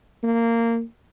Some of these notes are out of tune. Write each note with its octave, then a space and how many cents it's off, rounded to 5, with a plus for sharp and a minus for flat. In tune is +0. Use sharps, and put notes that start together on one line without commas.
A#3 -15